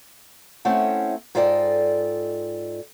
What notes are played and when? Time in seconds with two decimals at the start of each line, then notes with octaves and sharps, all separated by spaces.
0.65 A3 C4 C#4 E4 F#5
1.35 G#2 F4 A4 D5 D#5 G5